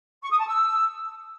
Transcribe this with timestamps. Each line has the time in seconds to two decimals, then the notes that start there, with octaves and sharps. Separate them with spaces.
0.23 C#6
0.31 D#6
0.39 A5
0.48 E6